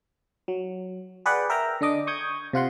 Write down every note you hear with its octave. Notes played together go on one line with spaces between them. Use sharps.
F#3
G#4 B4 D5 F#5 G5
A#4 E5 G5 A#5
D3 D4 D#5 D6
C#6 D#6 G6 G#6
C3 F4 F#5 C6